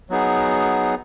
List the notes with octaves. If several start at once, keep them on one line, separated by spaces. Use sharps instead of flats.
F#3 B3 D#4 G#4